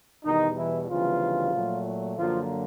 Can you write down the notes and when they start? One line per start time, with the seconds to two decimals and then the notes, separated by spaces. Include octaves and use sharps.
0.25 E2 B2 D#3 G3 D#4
0.57 E3 E4
0.89 D2 C#3 E3 F3 G3 B3 F4
1.53 A#2 F#3 A3
2.17 F#2 D3 F3 F#3 A#3 F4